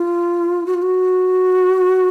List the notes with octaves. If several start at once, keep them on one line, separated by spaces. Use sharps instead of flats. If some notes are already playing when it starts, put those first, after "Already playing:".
Already playing: F4
F#4
F4
F#4